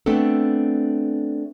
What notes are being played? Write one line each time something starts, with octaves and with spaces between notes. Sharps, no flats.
A3 B3 C4 D4 A4